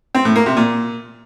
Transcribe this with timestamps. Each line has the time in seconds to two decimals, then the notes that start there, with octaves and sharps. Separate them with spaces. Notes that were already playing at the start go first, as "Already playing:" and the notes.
0.15 C4
0.25 A2
0.36 A#3
0.46 C3
0.57 A#2